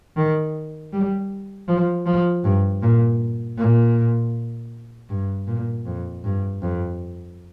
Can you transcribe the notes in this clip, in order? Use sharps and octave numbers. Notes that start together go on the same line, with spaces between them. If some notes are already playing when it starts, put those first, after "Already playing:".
D#3
G3
F3
F3
G2
A#2
A#2
G2
A#2
F2
G2
F2